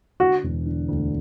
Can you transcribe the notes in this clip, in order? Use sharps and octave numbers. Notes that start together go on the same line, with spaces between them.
D3 F#4
E1
D3
D2